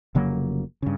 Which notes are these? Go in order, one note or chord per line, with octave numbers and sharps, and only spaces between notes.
F1 C#3 F#3 A#3
G2 C#3